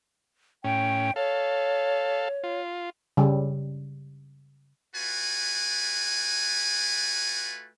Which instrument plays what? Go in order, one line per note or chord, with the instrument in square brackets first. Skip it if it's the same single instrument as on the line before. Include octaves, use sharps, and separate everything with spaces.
[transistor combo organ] A2 C#4 [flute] G5
[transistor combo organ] A4 F5 [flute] C#5
[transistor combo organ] F4
[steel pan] C#3 G3
[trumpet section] A3 F4 F#4 B4 G#5